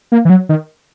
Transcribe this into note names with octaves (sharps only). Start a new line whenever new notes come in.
A#3
E3
F#3
D#3